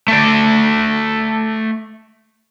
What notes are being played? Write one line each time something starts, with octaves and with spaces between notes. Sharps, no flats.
A3 D5